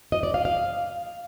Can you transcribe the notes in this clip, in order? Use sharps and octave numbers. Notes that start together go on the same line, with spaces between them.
D#5
D5
F5
F5